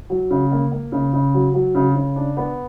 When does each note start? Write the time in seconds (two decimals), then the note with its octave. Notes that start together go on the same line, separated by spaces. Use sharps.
0.10 F#3
0.31 C#3
0.52 A#3
0.72 A#3
0.92 C#3
1.13 C#3
1.34 F#3
1.54 F#3
1.75 C#3
1.95 C#3
2.16 D4
2.37 B3